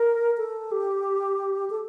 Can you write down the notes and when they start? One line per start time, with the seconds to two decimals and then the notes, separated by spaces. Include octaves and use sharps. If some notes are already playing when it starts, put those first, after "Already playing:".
Already playing: A#4
0.38 A4
0.72 G4
1.70 A4